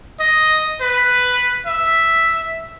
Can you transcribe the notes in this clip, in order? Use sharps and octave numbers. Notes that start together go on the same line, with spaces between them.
D#5
B4
E5